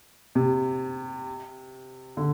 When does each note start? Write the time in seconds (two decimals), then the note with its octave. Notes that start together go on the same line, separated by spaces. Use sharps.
0.35 C3
2.17 D3